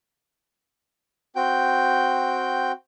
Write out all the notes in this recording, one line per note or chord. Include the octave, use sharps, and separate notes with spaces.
C4 F#4 G5 G6